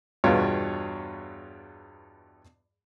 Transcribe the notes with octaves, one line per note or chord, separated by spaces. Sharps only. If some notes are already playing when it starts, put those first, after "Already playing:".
E2 G2 B2 F4 C#5